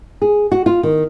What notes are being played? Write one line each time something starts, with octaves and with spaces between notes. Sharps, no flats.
G#4
F#4
F4
D#3